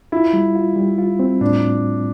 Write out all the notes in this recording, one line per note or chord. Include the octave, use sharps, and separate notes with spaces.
E4 F4
G3
F4
G3
F4
C4
A2 D4